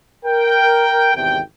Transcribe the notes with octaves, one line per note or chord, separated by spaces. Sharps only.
A#4 G5
G#1 E2 C3 G5